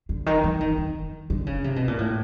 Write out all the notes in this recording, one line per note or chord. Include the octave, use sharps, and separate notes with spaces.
D3
D#3
E3
D#3
D#3
D3
C#3
C3
B2
A#2
A2